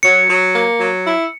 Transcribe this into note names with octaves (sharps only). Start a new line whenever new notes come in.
F#3 C#7
F#3
A#3
F#3
E4